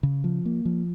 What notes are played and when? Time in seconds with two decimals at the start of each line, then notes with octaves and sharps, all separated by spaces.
0.03 C#3
0.24 F3
0.45 A#3
0.65 F3